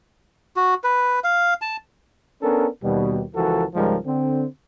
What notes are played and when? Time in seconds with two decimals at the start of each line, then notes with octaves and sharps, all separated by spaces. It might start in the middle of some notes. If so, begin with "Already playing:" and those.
0.56 F#4
0.84 B4
1.24 F5
1.62 A5
2.41 B3 C#4 D4 A4 A#4
2.83 D#2 B2 G3
3.34 C#2 E3 F3 F#4 A4 A#4
3.74 C#2 G#2 F3 G3 G#3 A#4
4.06 D3 C4